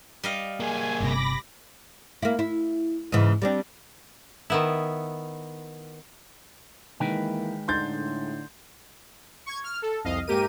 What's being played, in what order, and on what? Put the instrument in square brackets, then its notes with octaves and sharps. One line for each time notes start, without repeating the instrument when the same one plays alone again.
[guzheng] G3 D#5 F5
[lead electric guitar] A#3 G#4 [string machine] G#5
[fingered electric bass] G1 C3 [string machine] B5 D6 A#6
[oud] A#3 E4
E4
G#2 C#3 E3
G3 C4 D4
[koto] D#3 B3 E4
[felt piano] D#3 [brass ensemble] E3 A#3 [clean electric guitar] G#3 B4 G5
[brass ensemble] A2 D3 [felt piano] D#4 [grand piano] C6 G6 A6
[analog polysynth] C#6 G#6
F6
A4
C2 F2 D#5 F5
G#2 A#3 G4 A#4 D#7